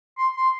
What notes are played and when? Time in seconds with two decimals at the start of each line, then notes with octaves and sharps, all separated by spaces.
0.18 C6
0.36 C6